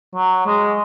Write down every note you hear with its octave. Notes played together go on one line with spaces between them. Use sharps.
F#3
G#3